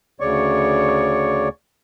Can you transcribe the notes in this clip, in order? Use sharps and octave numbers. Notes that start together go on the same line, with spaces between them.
D2 C#3 C#5 D5 C#6